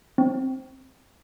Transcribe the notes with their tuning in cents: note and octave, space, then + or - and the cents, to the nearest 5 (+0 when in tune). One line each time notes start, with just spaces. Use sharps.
C4 +10